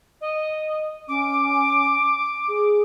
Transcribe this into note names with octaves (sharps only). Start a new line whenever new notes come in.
D#5
C#4 D6
G#4